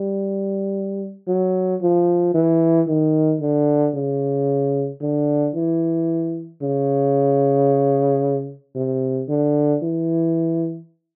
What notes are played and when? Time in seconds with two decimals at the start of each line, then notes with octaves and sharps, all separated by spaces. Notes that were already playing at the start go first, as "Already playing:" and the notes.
Already playing: G3
1.27 F#3
1.82 F3
2.34 E3
2.88 D#3
3.41 D3
3.95 C#3
5.02 D3
5.55 E3
6.62 C#3
8.76 C3
9.29 D3
9.82 E3